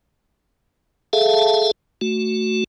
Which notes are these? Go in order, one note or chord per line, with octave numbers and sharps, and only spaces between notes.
G#4 A4 E5 F5 A5
A3 F#4